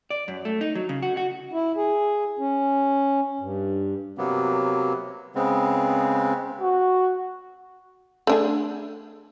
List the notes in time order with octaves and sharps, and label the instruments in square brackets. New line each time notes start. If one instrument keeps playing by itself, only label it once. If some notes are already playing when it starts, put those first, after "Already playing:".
[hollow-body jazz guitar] D5
F#2
A3
D#4
F#3
C#3
F#4
F#4
[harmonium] E4
G#4
C#4
G2
[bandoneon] C3 F#3 A#3 B3
C#3 G#3 B3 C4
[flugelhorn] F#4
[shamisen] A3 D4 G#4